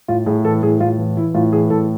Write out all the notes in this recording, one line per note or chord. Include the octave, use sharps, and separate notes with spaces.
A2 F4
A2 G#4
E3 A4
A2 G#4
A2 F4
E3
E3 E4
A2 F4
E3 G#4
A2 A4